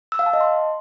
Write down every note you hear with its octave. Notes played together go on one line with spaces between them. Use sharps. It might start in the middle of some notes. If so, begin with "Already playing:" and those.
E6
F5
A5
D#5
C6